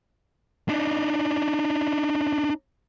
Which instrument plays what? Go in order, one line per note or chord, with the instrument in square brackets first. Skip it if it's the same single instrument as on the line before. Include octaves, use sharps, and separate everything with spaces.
[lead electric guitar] D4 D#4